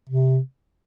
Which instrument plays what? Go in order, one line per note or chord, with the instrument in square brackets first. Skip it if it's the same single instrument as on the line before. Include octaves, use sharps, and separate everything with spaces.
[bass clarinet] C3